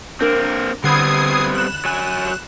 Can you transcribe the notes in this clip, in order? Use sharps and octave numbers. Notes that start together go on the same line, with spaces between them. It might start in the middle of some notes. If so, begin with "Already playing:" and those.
A#3 C4 D4 A#4
D3 G3 B3 C4 B5 D#6 G#6 C7
F#6 E7
F#3 G#5